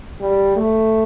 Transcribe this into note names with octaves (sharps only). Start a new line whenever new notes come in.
G3
A3